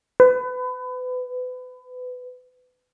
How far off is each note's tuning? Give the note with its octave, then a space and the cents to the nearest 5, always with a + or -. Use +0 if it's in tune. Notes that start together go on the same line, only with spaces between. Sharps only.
B4 +30